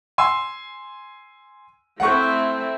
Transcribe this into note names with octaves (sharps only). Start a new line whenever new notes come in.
G#5 C6 E6
A3 C4 E4 F#5 C#6